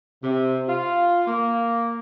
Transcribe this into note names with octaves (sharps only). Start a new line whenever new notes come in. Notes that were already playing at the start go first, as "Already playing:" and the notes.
C3
F4
A#3